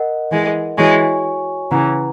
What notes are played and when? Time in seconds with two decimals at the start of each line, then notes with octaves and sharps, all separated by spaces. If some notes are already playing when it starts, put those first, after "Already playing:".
Already playing: A#4 D#5 F#5
0.31 E3 G#3
0.78 E3 G#3 F#4 C#5 G#5 C#6
1.71 C#3 E3 E4 B4 F#5 A#5